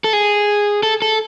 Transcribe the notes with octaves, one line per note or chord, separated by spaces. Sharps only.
A4
G#4
A4
A4